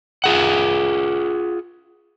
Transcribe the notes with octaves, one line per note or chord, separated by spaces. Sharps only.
F4 G#4 F#5